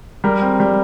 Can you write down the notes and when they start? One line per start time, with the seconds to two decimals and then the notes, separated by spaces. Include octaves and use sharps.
0.24 G3 A#4
0.42 C4
0.60 G3